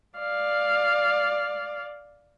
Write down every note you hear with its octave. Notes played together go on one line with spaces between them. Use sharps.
D5 F5